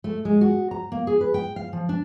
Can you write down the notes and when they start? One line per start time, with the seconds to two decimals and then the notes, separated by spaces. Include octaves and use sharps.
0.04 A3
0.25 G#3
0.41 F#4
0.71 A#5
0.92 A#3
1.07 G#4
1.21 B4
1.34 G5
1.56 F5
1.73 F3
1.89 D4